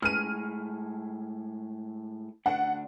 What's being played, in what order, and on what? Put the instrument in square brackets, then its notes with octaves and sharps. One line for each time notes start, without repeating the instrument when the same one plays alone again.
[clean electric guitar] A2 G#3 [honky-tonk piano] F6 D#7
[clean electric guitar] D2 D4 [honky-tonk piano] F#5